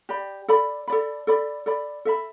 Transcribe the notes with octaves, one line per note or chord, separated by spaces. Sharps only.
G4 D5 G5 B5
A4 D5 B5
A4 D5 B5
A4 D5 B5
A4 D5 B5
A4 E5 B5